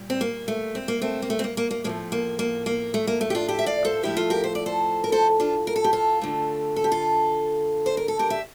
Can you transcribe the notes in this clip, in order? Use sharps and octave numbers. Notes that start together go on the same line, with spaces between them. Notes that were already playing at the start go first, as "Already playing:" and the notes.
Already playing: A#2 G3
C4
A#3
A3
C4
A#3
A3 C4
A#3
A3
C4
A#3
A#3
A#3
A2 F3 A3 A#3
A#3
A#3
A#3
A3
A#3
A3
G4
D4 F4
E4 G4
E5
D5 F5
A4 C5
A2 F3 A3 E4 G4
F4 A4
G4 A#4
C5
D5
A4 C5
A#4
A4 C5
D4 F4
A#4
A4
G4
F4 A4
D3 A3
A4
G4
F4 A4
C5
A#4
A4
G4 A#4
E5